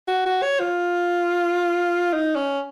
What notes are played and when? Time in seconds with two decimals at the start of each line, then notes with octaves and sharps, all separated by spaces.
0.08 F#4
0.25 F#4
0.42 C#5
0.60 F4
2.12 D#4
2.36 C#4